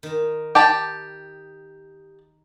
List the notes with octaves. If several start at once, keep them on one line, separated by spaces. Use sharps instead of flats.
D#3
G4 A5 B5